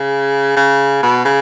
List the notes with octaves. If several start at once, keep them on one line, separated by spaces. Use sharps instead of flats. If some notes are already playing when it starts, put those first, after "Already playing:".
Already playing: C#3
C#3
B2
C#3